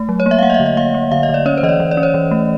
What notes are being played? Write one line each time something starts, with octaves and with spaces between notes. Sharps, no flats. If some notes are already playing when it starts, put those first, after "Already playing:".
Already playing: A3
F#3
C#5
A#3
E5
F5
A#3 F#5
D#5
E5
D3
D#5
A#3 F5
A#3
D3 F5
D#5
D3
D5
C#4 C#5
C5
E3 D#5
D5
E3
D5
C#4
C#5
E3
A3